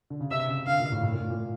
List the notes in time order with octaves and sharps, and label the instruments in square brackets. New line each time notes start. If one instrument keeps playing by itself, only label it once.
[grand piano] D3
C#3
[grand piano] C3 [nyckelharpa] E5
[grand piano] C#3
[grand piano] D3 [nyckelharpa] F5
[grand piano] A#2
A2
A2
A#2
A2
A#2